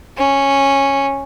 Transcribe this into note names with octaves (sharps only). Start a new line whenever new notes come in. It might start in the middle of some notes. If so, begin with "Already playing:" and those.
C#4